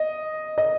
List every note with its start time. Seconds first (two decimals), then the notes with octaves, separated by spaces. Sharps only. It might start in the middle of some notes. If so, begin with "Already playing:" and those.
Already playing: D#5
0.58 D#5